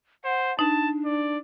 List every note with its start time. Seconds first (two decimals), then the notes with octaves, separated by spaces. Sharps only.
0.25 C5 F#5
0.59 D4 D#4 A5
1.05 D5